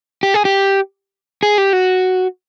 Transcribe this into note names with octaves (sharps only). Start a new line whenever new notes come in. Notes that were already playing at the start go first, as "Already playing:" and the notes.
G4
G#4
G4
G#4
G4
F#4